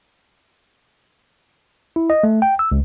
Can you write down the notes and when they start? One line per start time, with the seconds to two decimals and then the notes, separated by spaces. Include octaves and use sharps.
1.96 E4
2.10 D#5
2.24 A3
2.42 G5
2.59 E6
2.72 C#2